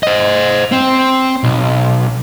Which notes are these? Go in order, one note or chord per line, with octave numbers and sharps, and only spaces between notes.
C5 D#5
C4
B1